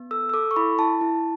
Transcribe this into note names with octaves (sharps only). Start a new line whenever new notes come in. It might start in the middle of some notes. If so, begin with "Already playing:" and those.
Already playing: B3
A4 E6
E6
A4 D6
C#6
E4 B5
E4 A5
E4